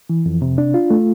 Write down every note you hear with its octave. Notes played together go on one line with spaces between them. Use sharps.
E3
F2
C3
D4
F4
A3